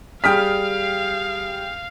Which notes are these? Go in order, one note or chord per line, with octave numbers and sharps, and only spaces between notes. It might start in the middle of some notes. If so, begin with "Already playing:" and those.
G3 G#4 F5 G5 D#6 F6 B6